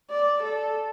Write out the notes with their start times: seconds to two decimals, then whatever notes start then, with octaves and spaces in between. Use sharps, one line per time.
0.10 D5
0.43 A4